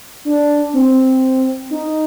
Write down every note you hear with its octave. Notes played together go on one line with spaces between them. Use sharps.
D4
C4
D#4